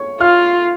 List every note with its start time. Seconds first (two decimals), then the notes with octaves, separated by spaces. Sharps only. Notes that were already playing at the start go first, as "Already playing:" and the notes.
Already playing: C#5 C#6
0.20 F4 F5 F6